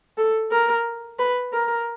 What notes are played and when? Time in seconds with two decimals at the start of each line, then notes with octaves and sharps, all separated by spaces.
0.18 A4
0.51 A#4
1.19 B4
1.53 A#4